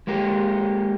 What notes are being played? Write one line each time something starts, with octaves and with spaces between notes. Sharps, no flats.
G#3 A#3 G4 A#4